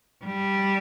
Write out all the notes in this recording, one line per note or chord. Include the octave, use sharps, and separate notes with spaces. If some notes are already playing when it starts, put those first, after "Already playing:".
G3